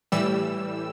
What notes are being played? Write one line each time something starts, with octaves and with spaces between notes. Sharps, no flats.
A2 E3 G3 E6